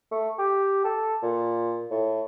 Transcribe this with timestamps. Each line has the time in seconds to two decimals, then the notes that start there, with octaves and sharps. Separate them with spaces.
0.12 A3
0.39 G4
0.84 A4
1.23 A#2
1.91 A2